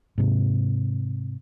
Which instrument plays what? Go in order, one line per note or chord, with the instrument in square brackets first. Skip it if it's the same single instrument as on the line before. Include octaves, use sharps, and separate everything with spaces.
[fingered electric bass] G#2 C3